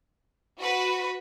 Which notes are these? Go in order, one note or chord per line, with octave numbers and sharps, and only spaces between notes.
F#4 B4